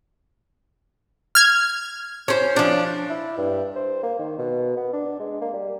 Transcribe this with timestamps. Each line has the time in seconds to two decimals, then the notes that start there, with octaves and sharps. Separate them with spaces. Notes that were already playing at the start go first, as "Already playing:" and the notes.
1.35 F6 G#6
2.28 C#4 C5
2.56 F3 D4
3.10 E4
3.38 G2
3.76 C5
4.03 A#3
4.19 D#3
4.39 B2
4.77 B3
4.93 D4
5.20 G#3
5.42 A#3
5.54 G3